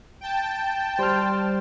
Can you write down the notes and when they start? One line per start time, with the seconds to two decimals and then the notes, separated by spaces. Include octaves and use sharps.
0.21 G5 A5
0.99 G3 C5 F6